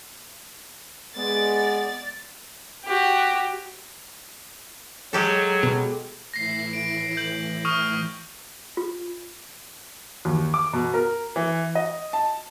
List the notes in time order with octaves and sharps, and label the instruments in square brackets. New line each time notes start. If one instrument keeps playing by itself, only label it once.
[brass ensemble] G#3 [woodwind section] B3 [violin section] D5 A6
[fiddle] F#4 G4
[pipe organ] F#3 [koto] G#3 G4 A4
[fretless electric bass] B2
[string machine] A2 E3 E4 [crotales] A#6 C7
[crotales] D7
G6 F#7
C#6 D#6 F6
[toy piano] F4
[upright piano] D#2
D6
B2
A#4
E3
D#5
A5